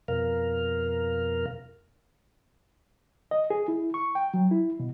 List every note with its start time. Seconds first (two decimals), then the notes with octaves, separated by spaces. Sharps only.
0.08 F2 B2 A#4 F5
3.31 D#5
3.50 G#4
3.68 E4
3.94 C#6
4.15 G5
4.34 F#3
4.51 E4
4.80 B2